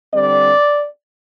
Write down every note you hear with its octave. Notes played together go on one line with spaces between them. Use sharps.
D3 G3 C4 D5